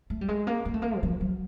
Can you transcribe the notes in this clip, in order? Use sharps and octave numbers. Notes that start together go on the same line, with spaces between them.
A3
G3
G#3
A#3
A#3
A3
A#3
E3
F3
F#3